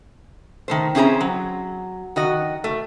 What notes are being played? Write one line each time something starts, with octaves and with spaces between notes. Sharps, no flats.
D#3 A3 C5
C4 C#4 E4 G#4 C5 A#5
F#3
D#3 F#4 D#5
A3